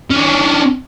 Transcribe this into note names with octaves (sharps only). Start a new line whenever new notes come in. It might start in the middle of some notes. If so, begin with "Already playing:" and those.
C#4 D4